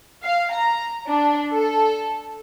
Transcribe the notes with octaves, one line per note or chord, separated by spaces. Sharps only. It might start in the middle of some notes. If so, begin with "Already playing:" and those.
F5
A#5
D4
A4